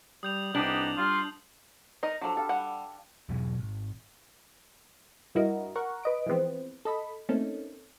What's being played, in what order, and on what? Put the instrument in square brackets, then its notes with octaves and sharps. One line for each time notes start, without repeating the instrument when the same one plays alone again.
[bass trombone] G3 [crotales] D#6 G6 F7
[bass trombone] C2 [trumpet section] B3 D#4 G4 [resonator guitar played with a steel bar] D4 [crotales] F#7
[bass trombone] G3 [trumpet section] F4
[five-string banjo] D#4 A#4 D#5
[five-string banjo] F3 F#3 [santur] D4 F#4 A4
[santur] G4 F5 B5 [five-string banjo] A4
[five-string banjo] G3 F#5
[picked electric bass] E2 B2 F#3 G#3
G#1
[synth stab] G2 E4 F#4 A#4 D#5
A#4 F#5 C#6
B4 D#5 D7
E3 F3 G#3 B3 C4
A4 D#5 B5
A3 A#3 C4 C#4 D#4 A4